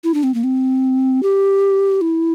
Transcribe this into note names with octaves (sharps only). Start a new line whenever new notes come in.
E4
D4
C4
A#3
C4
G4
E4